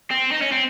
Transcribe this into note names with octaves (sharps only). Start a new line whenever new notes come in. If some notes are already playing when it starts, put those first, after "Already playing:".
C4
D#4
C#4
C4